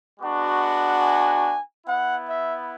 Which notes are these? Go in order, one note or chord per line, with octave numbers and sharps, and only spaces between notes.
G#3 B3 D4 F#4
G#5
B3 E4 F#5
E5